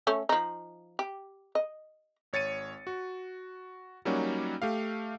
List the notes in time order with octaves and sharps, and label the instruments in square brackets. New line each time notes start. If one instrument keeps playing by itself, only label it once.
[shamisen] A3 C#4 A4
F3 D#4
G4
D#5
[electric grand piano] G#1 C#5 A6 C#7 D#7
F#4
F#3 G3 A#3 C#4 D#4 F#4
A3 G4 F5